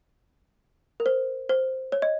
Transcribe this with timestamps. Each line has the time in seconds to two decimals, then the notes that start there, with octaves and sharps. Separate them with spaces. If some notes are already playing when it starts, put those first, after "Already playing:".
1.00 A#4
1.06 C5
1.49 C5
1.92 C#5
2.02 D#5